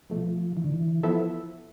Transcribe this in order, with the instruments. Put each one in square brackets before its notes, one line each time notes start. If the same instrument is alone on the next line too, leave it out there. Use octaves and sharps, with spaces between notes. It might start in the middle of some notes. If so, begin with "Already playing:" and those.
[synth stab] C2 B2 A3 [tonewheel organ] F3
[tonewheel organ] E3
D3
E3
[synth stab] F3 B3 E4 A4 E5